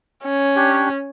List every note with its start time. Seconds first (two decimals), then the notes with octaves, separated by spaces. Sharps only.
0.24 C#4
0.56 D4 G4 C#5